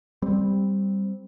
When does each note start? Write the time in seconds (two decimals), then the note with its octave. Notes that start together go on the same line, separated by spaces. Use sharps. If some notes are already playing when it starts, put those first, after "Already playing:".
0.22 G3 C4